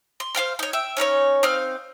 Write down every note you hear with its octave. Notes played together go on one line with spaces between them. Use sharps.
C6
C5 F5 G5 F6
D#4 C#5
E5 G5
C#4 D#4 A#4 C#5
C4 D#4 F5 F6